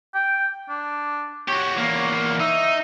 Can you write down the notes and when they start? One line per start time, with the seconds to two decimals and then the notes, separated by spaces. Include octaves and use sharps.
0.15 G5
0.69 D4
1.48 F#4 G4 C#5
1.78 E2 A#3
2.40 D#4 E5